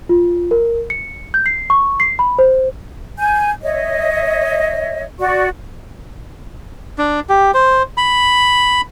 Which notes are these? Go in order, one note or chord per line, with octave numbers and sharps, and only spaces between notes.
F4
A#4
C#7
G6
C7
C#6
C7
B5
C5
G#5 G6
C#5 D#5 E5
F#4 D5 F#5 C#6
D4
G4
C5
B5